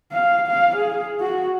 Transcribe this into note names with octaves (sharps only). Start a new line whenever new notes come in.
F5
F5
G#4
F#4